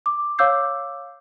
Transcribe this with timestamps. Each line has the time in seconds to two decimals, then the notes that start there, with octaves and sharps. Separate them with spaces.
0.06 D6
0.38 C#5 F5 D6 E6 G6 C7